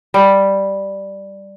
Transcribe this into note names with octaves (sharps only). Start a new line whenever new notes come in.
G3